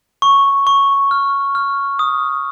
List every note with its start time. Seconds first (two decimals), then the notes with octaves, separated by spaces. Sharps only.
0.22 C#6
0.67 C#6
1.11 F6
1.55 F6
1.99 D#6